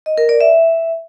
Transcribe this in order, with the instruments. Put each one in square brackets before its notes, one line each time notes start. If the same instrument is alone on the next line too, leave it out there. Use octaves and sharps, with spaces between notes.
[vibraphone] D#5
A#4
D5
E5